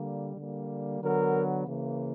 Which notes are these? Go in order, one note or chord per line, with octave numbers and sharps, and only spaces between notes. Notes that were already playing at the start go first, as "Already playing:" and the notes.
Already playing: D3 G3 A#3
D3 G3 A#3
D3 F#3 B3 A#4
C#3 E3 A#3